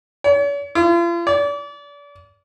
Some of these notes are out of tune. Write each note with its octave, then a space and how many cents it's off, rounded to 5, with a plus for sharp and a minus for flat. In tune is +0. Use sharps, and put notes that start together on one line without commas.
C#5 +45
F4 -40
D5 -35